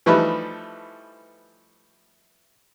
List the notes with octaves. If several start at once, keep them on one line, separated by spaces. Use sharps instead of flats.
E3 F3 G3 A3 D#4 B4